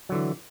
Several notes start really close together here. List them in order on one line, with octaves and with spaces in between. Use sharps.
F#3 D3 E3